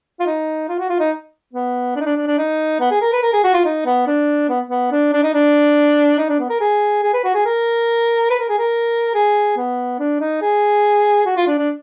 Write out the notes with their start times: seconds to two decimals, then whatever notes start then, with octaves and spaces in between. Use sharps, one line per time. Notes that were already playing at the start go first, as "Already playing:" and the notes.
0.20 F4
0.26 D#4
0.69 F4
0.79 F#4
0.89 F4
1.00 D#4
1.53 B3
1.96 D4
2.01 D#4
2.06 D4
2.16 D4
2.27 D4
2.38 D#4
2.80 B3
2.91 G#4
3.01 A#4
3.13 B4
3.23 A#4
3.33 G#4
3.44 F#4
3.54 F4
3.65 D#4
3.86 B3
4.07 D4
4.49 B3
4.70 B3
4.91 D4
5.13 D4
5.23 D#4
5.34 D4
6.18 D#4
6.29 D4
6.40 B3
6.50 A#4
6.61 G#4
7.03 G#4
7.14 B4
7.24 F#4
7.34 G#4
7.45 A#4
8.30 B4
8.40 A#4
8.49 G#4
8.59 A#4
9.15 G#4
9.57 B3
9.99 D4
10.20 D#4
10.42 G#4
11.26 F#4
11.37 F4
11.47 D4
11.58 D4